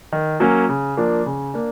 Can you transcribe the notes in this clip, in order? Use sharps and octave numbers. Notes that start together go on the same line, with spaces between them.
D#3
F#3 A#3 C#4
C#3
F3 A#3 D4
C#3
A#3 D4